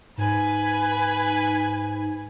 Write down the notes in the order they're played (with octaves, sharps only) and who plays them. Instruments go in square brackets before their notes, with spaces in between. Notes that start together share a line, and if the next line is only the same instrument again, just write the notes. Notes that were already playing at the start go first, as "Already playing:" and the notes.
[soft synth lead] G#2 [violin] B4 G#5